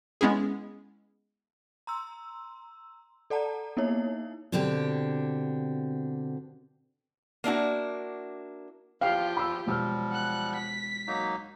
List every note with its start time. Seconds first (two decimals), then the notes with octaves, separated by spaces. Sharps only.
0.21 G#3 B3 C#4 E4 G#4
1.87 A#5 C6 E6
3.30 A4 D5 F#5 A5 A#5
3.77 A#3 B3 D#4 E4 C#5
4.52 B2 D3 C4 D4 G4
7.44 A#3 D4 E4 F#4
9.01 E2 F3 F4 G4 F5 G5 F6
9.37 B5 E6
9.66 E1 F3 G3 E6 F6
10.10 F#5 F#6
10.56 B6
11.07 F#3 A#3 D#4